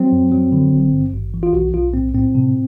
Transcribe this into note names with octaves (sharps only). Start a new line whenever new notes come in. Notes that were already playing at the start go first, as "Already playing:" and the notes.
Already playing: F#3 C4
F#2
F#3
D3
G#1
G2
G#1
E3
F4
B1 F#4
B1 F4
A2 C4
A2 C4
C3